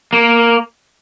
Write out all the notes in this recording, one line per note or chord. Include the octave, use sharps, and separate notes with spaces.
A#3